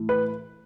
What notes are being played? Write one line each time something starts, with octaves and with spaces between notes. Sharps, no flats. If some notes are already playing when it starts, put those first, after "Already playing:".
Already playing: A2 E3 A3
B4